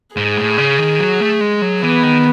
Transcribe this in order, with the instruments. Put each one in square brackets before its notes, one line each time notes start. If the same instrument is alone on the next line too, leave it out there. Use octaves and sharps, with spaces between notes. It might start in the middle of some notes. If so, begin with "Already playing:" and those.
[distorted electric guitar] G#2 [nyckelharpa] G#4
[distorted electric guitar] A2
C#3
D#3
F#3
A3
G#3
F#3
[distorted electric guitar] E3 [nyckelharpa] B3
[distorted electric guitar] D#3